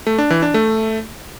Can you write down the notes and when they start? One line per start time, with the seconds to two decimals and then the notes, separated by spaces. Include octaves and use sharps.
0.07 A3
0.18 D4
0.30 E3
0.42 D4
0.54 A3